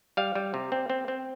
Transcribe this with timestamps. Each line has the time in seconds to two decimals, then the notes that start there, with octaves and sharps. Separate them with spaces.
0.17 G3 F5
0.35 G3
0.54 C3
0.72 C4
0.90 C4
1.08 C4